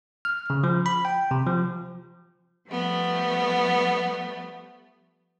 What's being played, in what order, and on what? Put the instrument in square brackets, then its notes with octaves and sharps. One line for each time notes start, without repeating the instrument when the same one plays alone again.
[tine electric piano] F6
C#3
F3
B5
G5
C3
F3
[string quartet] F3 G3 A3 B3